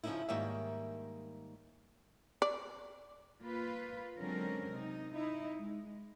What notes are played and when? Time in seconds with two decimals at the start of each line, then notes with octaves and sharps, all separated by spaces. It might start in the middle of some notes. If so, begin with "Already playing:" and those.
0.04 C#3 F3 G3 C#4 D#4 E4
0.29 G#2 D#3 G3 A#3 C#5 E5
2.42 D5
3.41 A#3 F4 B4
4.18 D3 F#3 G#3 C4 C#4 A#4
4.72 C3 D#4
5.15 D#4 E4
5.60 G#3